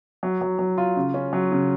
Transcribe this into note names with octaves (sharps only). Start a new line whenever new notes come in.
F#3
F#3
F#3
F4
C#3
C#4
F#3
C#3